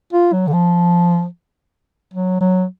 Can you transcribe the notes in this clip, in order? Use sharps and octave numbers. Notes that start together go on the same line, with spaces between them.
F4
F#3
D3
F3
F#3
F#3